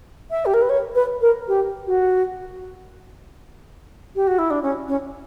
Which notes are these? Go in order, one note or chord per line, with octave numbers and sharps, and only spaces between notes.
E5
G4
A#4
B4
C#5
B4
A#4
G4
F#4
G4
F#4
E4
D4
C#4
C#4